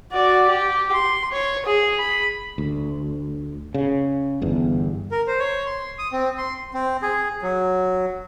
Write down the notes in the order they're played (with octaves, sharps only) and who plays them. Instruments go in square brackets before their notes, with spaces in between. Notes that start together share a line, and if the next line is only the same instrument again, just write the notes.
[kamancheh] F#4 D5
G4
C6
C#5
G#4
B5
[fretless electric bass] D2
C#3
G1 E2
[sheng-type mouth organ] A#4
C5
C#5
C6
D#6
C4
C6
[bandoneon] C4
G#4
F#3